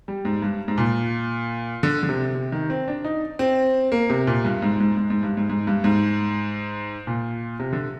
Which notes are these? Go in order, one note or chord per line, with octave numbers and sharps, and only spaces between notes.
G3
G#2
G2
G#2
A#2
D3
D3
C3
C3
D#3
C4
D4
D#4
C4
A#3
C3
A#2
G2
G#2
G#2
G#2
G#2
G2
G#2
G#2
G2
G#2
A#2
C3
D3